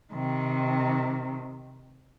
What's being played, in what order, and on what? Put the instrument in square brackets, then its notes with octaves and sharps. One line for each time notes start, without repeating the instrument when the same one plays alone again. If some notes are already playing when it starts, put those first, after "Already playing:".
[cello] C3 D#3